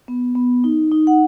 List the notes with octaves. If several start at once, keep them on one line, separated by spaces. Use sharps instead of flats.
B3
B3
D#4
D#4
F#5